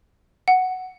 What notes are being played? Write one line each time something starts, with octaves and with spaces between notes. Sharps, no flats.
F#5